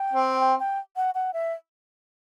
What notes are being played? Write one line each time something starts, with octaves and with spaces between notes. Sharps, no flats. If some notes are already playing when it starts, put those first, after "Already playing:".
Already playing: G5
C4
G5
G5
F#5
F#5
E5